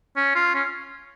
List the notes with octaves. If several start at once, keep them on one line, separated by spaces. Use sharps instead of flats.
C#4
F4
C#4